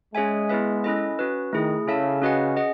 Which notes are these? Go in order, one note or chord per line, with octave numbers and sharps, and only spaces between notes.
G#3 C#4 G#4 C#5 E5 G#5
B3 E4 G#4 B4 E5
C#4 E4 A4 D#5
C#4 F#4 B4
D#3 A3 E4 G#4
C#3 E4 A4 E5 A5
C#4 F#4 B4 D#5 F#5
C#4 G#4 D#5 F#5